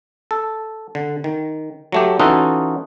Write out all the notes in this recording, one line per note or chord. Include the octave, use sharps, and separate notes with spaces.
A4
D3
D#3
F#3 A3 G4
E3 C#4 D#4 F4 F#4 A4